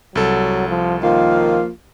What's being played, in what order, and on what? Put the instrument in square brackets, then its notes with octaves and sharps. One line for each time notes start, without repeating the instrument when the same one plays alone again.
[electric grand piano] C2 A4 [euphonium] F#3
[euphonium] F3
[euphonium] D#3 [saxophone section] F3 A#3 F4